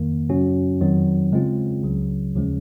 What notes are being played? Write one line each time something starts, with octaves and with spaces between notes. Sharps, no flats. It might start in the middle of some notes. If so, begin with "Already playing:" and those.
Already playing: F2 D#3 A#3
F#2 C#3 F#3 C#4 F#4
F2 D#3 F#3 C4 D#4
C#3 G#3 C4 F4
C#2 C#3 F#3
D#2 C#3 F3 G#3 C#4